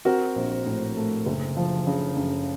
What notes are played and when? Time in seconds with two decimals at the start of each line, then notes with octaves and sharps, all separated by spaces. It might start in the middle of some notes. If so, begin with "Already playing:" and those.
0.05 C4 F#4 A#4
0.36 A#1
0.66 A2
0.97 A3
1.26 F#1
1.57 F3
1.87 C#3
2.16 F#2